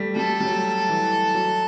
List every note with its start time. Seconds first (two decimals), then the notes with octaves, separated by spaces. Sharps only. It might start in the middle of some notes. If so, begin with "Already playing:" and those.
Already playing: G3 A3
0.16 G3 A4
0.40 G3
0.45 F#3
0.89 E3
1.34 F#3